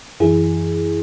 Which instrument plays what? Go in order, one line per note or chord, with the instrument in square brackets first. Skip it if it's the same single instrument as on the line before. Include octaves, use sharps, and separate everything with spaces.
[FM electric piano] F#2 E3 E4 G#4